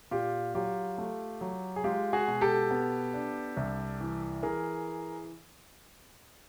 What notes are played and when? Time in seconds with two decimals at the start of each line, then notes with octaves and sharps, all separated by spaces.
0.11 A#2 F4 G4
0.55 F#3 F4 G4
0.98 A3
1.41 F#3
1.76 G#4
1.84 G#3 F4 G4
2.13 F#4 G#4
2.28 B2
2.41 G4 A4
2.71 B3
3.14 D4
3.57 C2
4.01 E3
4.43 E3 G#4 A#4